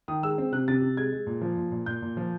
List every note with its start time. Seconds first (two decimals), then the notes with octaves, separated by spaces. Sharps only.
0.08 D#3 D#6
0.23 G#3 E6
0.38 C4
0.52 C3 F#6
0.68 C3 A6
0.82 C3
0.97 G#3 G#6
1.12 G#3
1.27 A#2
1.41 F3
1.57 A#2
1.72 A#2
1.86 A#2 G6
2.02 A#2
2.17 F3